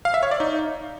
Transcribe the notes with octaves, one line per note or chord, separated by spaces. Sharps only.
F5
E5
C#5
D5
D#4